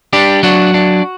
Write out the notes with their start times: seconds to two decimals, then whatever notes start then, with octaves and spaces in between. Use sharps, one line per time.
0.13 G3 D4 G4
0.43 F#3 D4 F#4
0.74 D4